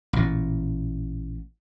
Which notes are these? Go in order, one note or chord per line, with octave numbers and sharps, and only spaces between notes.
A1 A#2